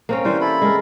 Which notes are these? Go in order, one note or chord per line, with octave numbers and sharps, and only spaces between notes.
A#3 C4 C#4
E3 G3 C5 F5
E4 A4 B5
G#3 A#4